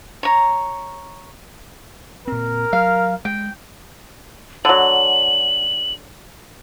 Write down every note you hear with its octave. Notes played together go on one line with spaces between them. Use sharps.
C#5 A#5
A#2 C4 A#4
F#3 F5
G#3 G5
D3 F#3 F#7